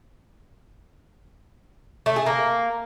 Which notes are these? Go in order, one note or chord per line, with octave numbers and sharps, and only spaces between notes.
A3
G#4
A#3